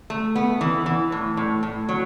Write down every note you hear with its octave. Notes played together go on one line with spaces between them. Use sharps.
A3
B3
E3
E3
A2
A2
A2
F#3